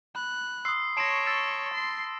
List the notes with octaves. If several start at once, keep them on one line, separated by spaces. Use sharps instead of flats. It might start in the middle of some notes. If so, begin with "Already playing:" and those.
B5 F#6
C6 D#6 E6 C7
C#5 A5 C6 C#6 A#6 C7 D7 E7
E6 A6 E7
C6 C7